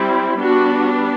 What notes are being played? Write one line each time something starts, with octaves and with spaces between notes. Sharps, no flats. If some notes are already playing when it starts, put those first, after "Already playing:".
Already playing: G3 C4 E4
G3 B3 D4 F#4